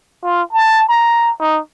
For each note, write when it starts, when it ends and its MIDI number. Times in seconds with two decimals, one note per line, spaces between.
0.24 0.42 65
0.53 0.88 81
0.89 1.31 82
1.40 1.60 63